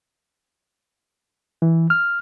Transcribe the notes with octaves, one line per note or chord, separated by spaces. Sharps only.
E3
F6